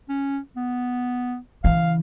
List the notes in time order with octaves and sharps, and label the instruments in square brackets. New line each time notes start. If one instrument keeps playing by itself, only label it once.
[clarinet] C#4
B3
[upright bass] C#3 E3 [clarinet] F5